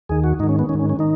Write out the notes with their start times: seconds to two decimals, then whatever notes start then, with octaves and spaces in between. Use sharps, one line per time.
0.09 D#2 D#3 G#4
0.24 F#4
0.39 G#2 D#4
0.44 D#3
0.49 C#4
0.59 B3
0.69 G#2 D#3 C#4
0.79 C#4
0.90 C#4
0.99 D#3 D#4